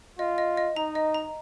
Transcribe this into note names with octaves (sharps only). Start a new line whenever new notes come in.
F4 D#5
D#5
D#5
D#4 A#5
D#5
A#5